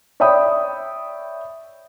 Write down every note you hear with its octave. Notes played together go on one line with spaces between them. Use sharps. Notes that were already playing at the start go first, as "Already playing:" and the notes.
C#5 D5 E5 G5 B5 D#6